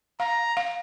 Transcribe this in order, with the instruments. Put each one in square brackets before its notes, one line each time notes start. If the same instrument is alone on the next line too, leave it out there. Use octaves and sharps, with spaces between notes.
[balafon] F5 [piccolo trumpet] A#5
[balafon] F5